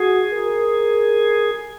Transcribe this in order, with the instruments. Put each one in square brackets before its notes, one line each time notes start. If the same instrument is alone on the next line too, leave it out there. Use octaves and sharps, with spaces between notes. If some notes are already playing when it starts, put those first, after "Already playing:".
Already playing: [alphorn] F#4 [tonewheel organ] G#4
[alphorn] A#4